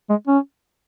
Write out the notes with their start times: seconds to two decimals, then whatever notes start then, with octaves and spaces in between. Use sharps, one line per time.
0.10 G#3
0.27 C#4